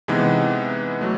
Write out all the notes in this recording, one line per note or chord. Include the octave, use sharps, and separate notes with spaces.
C3 E3 G#3 B3 D#4
F#3 A3